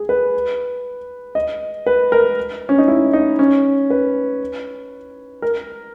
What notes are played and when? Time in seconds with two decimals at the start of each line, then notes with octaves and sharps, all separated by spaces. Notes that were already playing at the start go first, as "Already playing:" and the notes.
Already playing: G#4
0.09 B4
1.35 D#5
1.87 B4
2.12 A#4
2.69 C#4
2.78 D#4
2.88 E4
3.13 D#4
3.39 C#4
3.90 B4
5.42 A#4